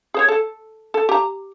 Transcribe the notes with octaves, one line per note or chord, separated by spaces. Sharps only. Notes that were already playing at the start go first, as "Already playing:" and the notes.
G#4 C5 C#5
A4
A4
G4 A#5